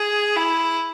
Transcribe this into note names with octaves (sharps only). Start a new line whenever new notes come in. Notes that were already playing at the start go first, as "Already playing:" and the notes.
Already playing: G#4
E4